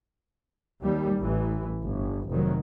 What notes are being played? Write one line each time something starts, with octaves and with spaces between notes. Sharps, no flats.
D#2 G3
A1 E3
G1
F1 D#3 F#3